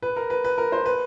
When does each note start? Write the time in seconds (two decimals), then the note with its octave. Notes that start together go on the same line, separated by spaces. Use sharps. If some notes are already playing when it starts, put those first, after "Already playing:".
0.03 B4
0.16 A#4
0.30 B4
0.45 B4
0.58 A#4
0.72 C5
0.86 B4